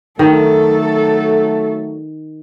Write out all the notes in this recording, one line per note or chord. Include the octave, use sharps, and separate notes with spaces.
D#3 F#3 A3 A4